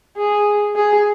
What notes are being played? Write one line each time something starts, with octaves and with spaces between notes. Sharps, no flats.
G#4
G#4